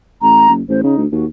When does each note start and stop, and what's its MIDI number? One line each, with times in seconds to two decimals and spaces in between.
0.22 0.46 33
0.22 0.52 82
0.49 0.62 30
0.69 0.82 33
0.69 0.81 72
0.84 0.97 49
0.84 1.02 63
0.98 1.06 38
1.12 1.26 39
1.12 1.25 66